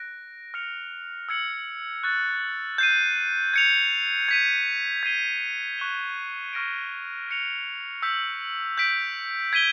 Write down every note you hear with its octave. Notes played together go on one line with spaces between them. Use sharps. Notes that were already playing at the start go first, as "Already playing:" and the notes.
Already playing: F#6 A#6 D7
F6 A#6 C#7 F7
E6 G#6 C#7 F#7
C#6 F#6 A6
G6 C7 D#7
G#6 C#7 F7
G#6 B6 D#7
G#6 C7 D#7 G7
C#6 F#6 B6 E7 G7
C#6 F6 A#6 D7
F#6 A#6 C#7 F7
E6 G6 B6
G6 B6 D7
G#6 B6 D#7 G7